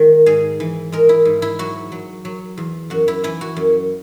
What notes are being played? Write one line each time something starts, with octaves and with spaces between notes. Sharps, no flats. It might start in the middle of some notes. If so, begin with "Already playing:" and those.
Already playing: D#3 G#3
G#2 G#4
E3
G#3 A#4
E4
G#2
E4
F#3 F#4
F#3
F#3
E2
F#2 F#4
E4
E3 E4
F#4
F#2